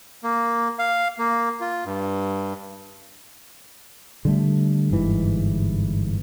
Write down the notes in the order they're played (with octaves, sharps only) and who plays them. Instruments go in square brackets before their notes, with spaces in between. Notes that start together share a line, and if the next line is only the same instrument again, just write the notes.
[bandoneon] A#3
F5
A#3
F4
G2
[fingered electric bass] D3 G3 A3
G1 G#2 E3